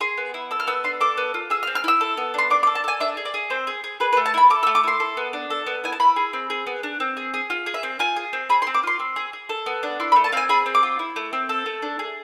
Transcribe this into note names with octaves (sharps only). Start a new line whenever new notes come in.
G#4 C6
B3
E4
A4 E6
F6
B3 E6
D4 C6
A4 D6
B3
F4
G#4 E6
F6
C4
F6
E4 E6
A4
B3
D4 C6
D4 D6
D6
A4
A5
A4 G#5
D4 E5
G#4
D5
G#4
C4 C5
G#4
G#4
G#4 B4
B4
A3
A5
E4 B5
A4 D6
E6
A3
D6
E4 C6
A4
B3
D4
A4
B3
E4 G#5
A5
E4 B5
G#4
C4
G#4
B3
D4
C4
G#4
G#4
F4
G#4
E5
C4
F4 G#5
G#4
C4
G#4 B5
C6
C4
D6
F4 C6
C4
G#4
G#4
A4
B3
D4
E4 C6
B5
A3
A5
C4 F5 G#5
G#4 B5
C4
D6
F4
E4
A3
C4
A4
A3
D4
G#4